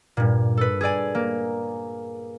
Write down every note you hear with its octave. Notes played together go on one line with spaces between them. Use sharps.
G2 A#2
A4 B4
G#4 A4 D5 G#5
A#3